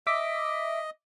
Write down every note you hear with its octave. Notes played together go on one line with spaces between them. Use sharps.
D#5 E5 D6 B6